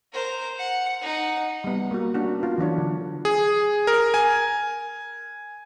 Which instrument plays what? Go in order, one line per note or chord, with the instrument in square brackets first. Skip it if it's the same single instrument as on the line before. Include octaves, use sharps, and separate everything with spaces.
[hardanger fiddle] A#4 C5
F#5
D#4 F#5
[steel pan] G3 B3
A#3 F#4
C#4 D4 F#4
B3 F4
E3 F#3 D4 C#5
D3
[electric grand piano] G#4
A#4
G#5